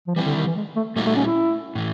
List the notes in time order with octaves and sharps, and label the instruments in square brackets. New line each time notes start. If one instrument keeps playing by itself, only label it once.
[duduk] F3
[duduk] E3 [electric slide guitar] G3 C4 E4
[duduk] D3
D#3
E3
G#3
A3
[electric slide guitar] A#2 G3 A#3 D#4 F#4 [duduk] A3
[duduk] A3
C#4
E4
[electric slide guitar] A2 E3